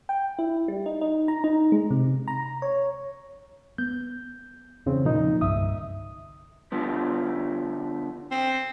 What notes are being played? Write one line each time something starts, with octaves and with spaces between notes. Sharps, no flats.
G5
E4
G3
D#4
D#4
A#5
D#4
G#3
C3
A#5
C#5
B3 G6
E2 C#3 C4
A#2 F3 D#4
C2 G2 D3 E5 D#6
D3 F3 B3
C4